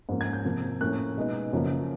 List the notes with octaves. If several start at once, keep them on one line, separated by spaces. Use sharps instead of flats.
G#2 F3 A#3 C#4
G#6
G6
C3 F3 A#3
A2 F3 A#3 C#4 F#6
B2 G#3 B3 D#4
F#2 C#3 F3 A#3